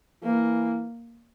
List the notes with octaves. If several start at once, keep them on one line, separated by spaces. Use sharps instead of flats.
E3 A#3